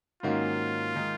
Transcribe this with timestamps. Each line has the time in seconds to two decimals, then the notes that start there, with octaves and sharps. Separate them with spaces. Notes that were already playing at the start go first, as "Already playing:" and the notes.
0.23 G#2 D#3 A#3 C#4 F4 F#4
0.96 D#3 G#3 D#4